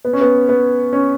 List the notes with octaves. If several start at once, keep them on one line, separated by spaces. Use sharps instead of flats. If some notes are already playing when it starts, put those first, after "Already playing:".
B3
C#4
B3
B3
C#4